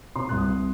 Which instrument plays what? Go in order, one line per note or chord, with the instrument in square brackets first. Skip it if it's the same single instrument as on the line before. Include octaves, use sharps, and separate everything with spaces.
[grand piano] C3 C6
C2 F#6
D#6